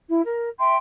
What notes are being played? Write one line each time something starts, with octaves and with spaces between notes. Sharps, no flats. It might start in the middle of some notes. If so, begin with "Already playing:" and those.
E4
A#4
E5 G5 C6